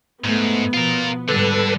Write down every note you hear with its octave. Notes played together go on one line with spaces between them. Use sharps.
G#2 A3 B3
B2 F3 F4 A#4
G#2 D3 G3 D4 A4 B4